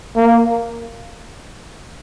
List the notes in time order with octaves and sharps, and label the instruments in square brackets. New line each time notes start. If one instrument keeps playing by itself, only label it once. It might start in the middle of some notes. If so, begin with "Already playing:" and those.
[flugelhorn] A#3